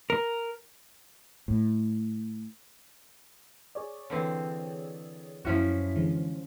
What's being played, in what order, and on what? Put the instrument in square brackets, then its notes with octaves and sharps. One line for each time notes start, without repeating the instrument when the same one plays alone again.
[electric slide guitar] A#4
[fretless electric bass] A2
[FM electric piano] G#4 C#5 D5
[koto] D3 E3 C4
[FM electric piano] F#2 E4 B6 [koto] F3 C#4 F#4
[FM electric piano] D3 E3 G#3